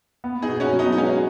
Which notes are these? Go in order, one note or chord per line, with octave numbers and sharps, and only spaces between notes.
B3
D#4 G#4
B2
C#4 F#4
F#3
B3 D#4
D#4
G#3 C#4 F#4